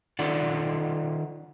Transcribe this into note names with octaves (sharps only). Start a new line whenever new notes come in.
D#3 D#4 F4 A4 D5 F#5